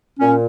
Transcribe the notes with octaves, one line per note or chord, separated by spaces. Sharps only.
A#2 C#4